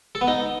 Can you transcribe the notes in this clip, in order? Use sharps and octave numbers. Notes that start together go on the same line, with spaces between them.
A4
B3
D#4